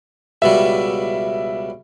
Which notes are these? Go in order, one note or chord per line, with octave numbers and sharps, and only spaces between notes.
C#2 B2 G3 E5